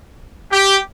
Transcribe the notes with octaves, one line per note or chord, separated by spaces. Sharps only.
G4